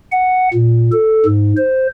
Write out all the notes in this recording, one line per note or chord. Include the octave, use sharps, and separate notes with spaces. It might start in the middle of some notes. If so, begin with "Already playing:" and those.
F#5
A#2
A4
G#2
C5